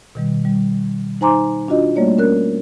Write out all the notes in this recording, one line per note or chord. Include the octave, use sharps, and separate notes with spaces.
B2 D#3 G3
G3
D#4 C5 G#5 A#5 C6 D6
D4 F4 F#4 D#5
G3 A3 A#3 C#5 D5
C#4 A#4 F#6